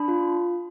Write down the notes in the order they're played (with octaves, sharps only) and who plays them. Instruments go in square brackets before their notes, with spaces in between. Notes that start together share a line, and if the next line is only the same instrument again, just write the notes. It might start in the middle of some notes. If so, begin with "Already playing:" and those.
Already playing: [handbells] D4 B5
F4